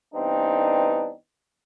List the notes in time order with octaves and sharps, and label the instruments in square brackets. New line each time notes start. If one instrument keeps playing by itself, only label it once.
[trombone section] G2 E3 B3 C4 D4 D#4